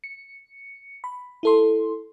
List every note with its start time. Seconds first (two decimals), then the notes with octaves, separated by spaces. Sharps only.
0.04 C#7
1.04 B5
1.43 E4 A4 C6